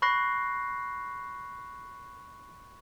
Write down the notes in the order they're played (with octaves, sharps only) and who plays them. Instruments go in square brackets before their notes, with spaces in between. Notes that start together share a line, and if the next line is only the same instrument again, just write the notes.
[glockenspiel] B5 C#6 F#6 A#6 C7